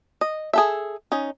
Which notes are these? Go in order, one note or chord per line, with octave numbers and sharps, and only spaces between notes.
D#5
G#4 A4 E5
C#4 D#4